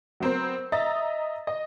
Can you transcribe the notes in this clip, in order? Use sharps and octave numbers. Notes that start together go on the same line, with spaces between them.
F#3 B3 C4 A#4 C5
D#5 E5 A#5 D#6 A6
D#5